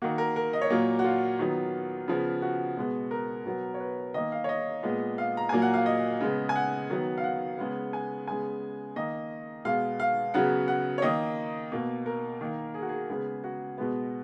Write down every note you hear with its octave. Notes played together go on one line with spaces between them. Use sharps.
D#3 A#3 F#4
A#4
A#4
D#5
C#5
A#2 F#3 A#3
F#4
F4
D#3 F#3 B3
C#3 F3 B3
F#4
B2 G#3 B3
A#4
B2 F#3 B3
C#5
B4
D#3 A#3 D#5
F5
C#5
D#5
A#2 G#3 B3
F5
A#5
A#2 F#3 A#3 G#5
F#5
F5
D#5
C#3 G#3 B3
G#5
F#5
D#3 F#3 B3
F5
F#5
C#3 G#3 B3
G#5
C#3 G#3 B3 G#5
D#3 A#3 D#5
B2 G#3 B3 F5
F5
C#3 F#3 B3 F#5
F#5
C#5
D#3 A#3 D#5
B2 A#3
A#4
D#3 A#3
G#4
F#4
G#4
C#3 G#3 B3
F#4
B2 G#3 B3